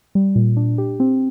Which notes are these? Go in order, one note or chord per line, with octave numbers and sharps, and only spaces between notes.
G3
A#2
D4
G4
C4